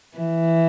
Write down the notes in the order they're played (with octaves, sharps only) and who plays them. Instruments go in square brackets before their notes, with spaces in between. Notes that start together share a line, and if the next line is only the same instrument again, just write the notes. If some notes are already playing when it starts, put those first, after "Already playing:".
[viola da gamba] E3